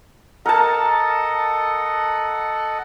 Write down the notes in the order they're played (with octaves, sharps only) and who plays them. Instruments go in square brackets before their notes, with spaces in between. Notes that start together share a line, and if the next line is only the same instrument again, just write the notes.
[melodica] A4 D#5 F#5 [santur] A#4 A5